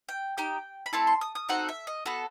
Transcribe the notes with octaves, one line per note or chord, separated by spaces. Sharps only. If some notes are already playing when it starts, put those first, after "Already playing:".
G5
D#4 G4 G5
B5
A3 C4 E4 A4 A5
C6
D#6
D#6
C4 D#4 F#4 A4 F#5
E5
D#5
B3 F#4 A4